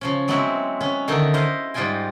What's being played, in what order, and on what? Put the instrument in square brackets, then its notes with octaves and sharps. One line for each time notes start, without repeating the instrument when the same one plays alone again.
[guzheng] C#3 F3 C#4
F#3 G#3 B3 C4 E4 F#4
B3 C#4
D3 D#3 B3 D#4 E4
E4 C5 D#5 F5
G#2 G3 D#4 F4 G5 G#5